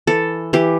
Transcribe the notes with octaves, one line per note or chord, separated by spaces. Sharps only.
E3 A4
E3 G4